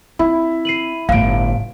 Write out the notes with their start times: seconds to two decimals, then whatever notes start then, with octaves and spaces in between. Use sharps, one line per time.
0.19 C4 E4
0.65 C7 D#7 F#7
1.09 G1 A2 F5 D7